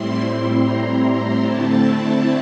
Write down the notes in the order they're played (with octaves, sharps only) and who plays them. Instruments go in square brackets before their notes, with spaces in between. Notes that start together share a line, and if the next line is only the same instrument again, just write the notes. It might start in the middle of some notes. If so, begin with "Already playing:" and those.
Already playing: [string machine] A2 G3 C4 E4 C6
A#5
A#5
D3 A3 C4 E4 A5